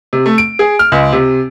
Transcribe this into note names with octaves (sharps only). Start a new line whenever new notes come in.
C3
A3
D7
G#4
F6
C#2
C3